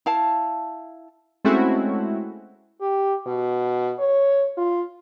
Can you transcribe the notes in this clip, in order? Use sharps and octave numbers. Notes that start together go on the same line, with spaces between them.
E4 F5 A5
G#3 A3 C4 C#4 E4 F#4
G4
B2
C#5
F4